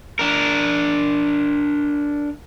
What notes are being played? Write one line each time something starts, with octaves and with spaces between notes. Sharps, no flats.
D4 A#4